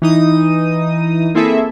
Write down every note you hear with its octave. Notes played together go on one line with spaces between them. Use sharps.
E3 D#4 D#6
A#3 C4 E4 G#4 A4 E5